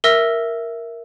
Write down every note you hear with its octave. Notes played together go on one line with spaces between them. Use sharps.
A#4 E5 E6 A#6